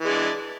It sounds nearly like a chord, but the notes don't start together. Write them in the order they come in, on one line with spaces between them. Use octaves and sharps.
E3 G#3 D4